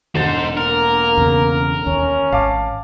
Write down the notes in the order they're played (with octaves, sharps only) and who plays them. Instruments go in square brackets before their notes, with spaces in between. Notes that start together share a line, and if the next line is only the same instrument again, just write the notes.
[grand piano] E1 D3 A6 [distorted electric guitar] D#4 C5
[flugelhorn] A#3 [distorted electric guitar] A#4
[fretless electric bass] E2 C#3
[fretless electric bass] D#2 [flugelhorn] C#4
[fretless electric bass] G#1 [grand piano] F5 A5 D6